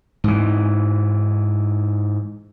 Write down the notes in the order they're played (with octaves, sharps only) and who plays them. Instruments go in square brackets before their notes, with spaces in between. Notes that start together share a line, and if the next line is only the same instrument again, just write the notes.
[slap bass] G#2 E3